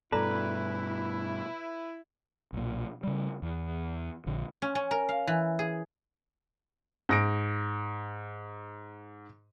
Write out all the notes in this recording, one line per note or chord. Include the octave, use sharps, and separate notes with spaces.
G2 B2 E4 A4 B4 D5 A#5
B1 A#2
C#3 G3
E2
A#1 D3
C#4
C#4
A#4
F5
E3
G#4
G#2 A#6 D7